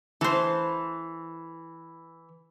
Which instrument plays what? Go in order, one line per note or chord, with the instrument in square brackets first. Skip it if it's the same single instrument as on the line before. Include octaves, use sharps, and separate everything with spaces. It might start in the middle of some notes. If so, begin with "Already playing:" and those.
[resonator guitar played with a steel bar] E3 [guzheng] A4 C5